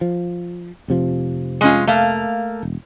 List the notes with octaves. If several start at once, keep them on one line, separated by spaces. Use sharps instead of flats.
F3
F1 C3 F3
G#3 C#4 F4
A3 A#3 F5
E1